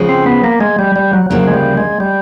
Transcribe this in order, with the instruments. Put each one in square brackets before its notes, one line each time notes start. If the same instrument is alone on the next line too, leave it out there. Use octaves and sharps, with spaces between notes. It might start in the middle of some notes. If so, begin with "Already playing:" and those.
Already playing: [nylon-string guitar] C#3 F3 G#3 C#4 F#4
[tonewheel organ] C4
B3
A#3
G#3
G3
G3
F#3
[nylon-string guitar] D2 C#3 F3 A#3 [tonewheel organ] F#3
[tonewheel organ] G#3
G3
G#3
G3